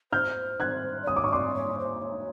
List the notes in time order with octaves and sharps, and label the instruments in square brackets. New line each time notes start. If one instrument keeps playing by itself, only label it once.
[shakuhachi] C5 [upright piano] F6 G6
[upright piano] F#6 G#6
[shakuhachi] D5
[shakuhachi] C#5 [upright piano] D#6
[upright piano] D6
C#6
[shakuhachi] D5 [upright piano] C6 D6
[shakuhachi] C#5
C5
C#5